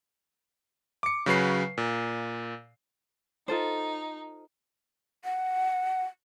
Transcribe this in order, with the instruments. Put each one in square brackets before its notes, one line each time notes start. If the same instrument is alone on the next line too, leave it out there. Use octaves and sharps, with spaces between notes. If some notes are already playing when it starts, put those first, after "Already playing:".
[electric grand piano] D6 C#7
C#3 F#3 B4 C7
A#2
[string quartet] D#4 [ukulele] F4 A4 C5
[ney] F#5